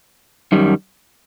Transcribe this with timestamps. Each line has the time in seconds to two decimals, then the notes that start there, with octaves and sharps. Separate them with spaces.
0.52 F#2 D#3 G3